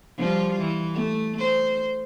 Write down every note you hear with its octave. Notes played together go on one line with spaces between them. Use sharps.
F3 G3 F4
E3
A3
C5